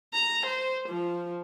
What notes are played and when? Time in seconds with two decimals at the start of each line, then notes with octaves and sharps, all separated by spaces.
0.13 A#5
0.46 C5
0.89 F3